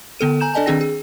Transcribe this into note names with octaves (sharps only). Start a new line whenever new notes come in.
D3 B3 A4 D#7
G#5 A#5 G6 E7
D4 A4 D5 D#5 G#5 A5
D#3 C4 D4 G#4 G5 A#6
G#4